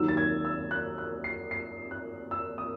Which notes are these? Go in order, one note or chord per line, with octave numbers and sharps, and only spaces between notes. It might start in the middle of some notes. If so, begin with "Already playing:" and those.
Already playing: D#2 D#3 F#3 E6
A6
G#6
E6
F#6
F#6
C7
C7
F#6
E6
D#6